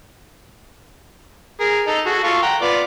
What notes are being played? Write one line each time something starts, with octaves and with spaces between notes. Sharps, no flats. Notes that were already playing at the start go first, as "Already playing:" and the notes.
G#4 A#4
D#4 A4
F#4 G#4 A4
F4 A4 C#6
F#5 G5 A#5
B3 F4 D5